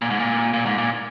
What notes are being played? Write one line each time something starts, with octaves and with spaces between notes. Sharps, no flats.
A#2
G#2
A#2
A#2
G#2
A#2